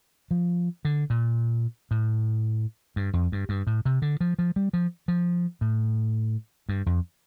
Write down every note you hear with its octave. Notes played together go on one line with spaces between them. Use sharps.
F3
D3
A#2
A2
G2
F2
G2
G2
A2
C3
D3
F3
F3
G3
F3
F3
A2
G2
F2